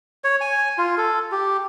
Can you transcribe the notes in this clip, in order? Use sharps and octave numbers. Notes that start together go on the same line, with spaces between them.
C#5
G#5
F4
A4
G4